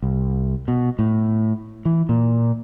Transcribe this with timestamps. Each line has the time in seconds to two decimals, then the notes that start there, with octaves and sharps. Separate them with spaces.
0.02 C2
0.68 B2
0.99 A2
1.85 E3
2.09 A#2